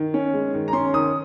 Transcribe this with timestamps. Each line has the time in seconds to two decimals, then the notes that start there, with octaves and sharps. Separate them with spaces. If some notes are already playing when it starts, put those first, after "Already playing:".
Already playing: D#3
0.14 C#4
0.34 G#3
0.54 D#3
0.68 A#5
0.73 C#4 C6
0.94 D#3 D#6